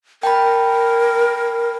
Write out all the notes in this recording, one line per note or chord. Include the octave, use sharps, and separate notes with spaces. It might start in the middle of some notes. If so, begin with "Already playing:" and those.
A#4 G5 A5 B5